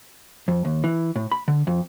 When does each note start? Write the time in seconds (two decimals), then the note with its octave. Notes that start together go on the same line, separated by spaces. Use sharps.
0.48 F2
0.65 D#2
0.84 E3
1.16 A2
1.32 B5
1.48 D3
1.67 F2